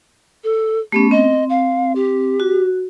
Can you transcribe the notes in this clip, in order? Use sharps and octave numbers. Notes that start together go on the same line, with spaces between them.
A4
A3 B3 C#4 G4
C4 D#5
F5
G4
F#4